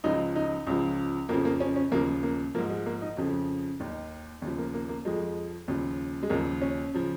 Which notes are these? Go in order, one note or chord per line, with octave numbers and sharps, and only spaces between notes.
C#2 C#3 F3 D#4
D#4
C#2 C#3 F3
F2 C#3 F3 A#3
A#3
C#4
C#4
D#2 C#3 F3 A#3
A#3
G#2 F3 A#3
G#3
A#3
D#4
F2 C#3 F3
D#2 D#3
D#2 C#3 F3
A#3
A#3
A#3
F2 F3 G#3
D#2 C#3 F3
G#3
D#2 C#3 F3 A#3
C#4
C#3 F3